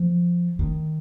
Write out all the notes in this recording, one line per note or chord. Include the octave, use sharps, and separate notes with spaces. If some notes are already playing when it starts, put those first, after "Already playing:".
Already playing: F3
D#3